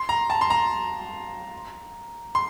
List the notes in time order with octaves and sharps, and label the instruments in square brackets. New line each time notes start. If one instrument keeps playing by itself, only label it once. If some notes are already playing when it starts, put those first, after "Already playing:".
Already playing: [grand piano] C6
A#5
A5
C6
A#5
C6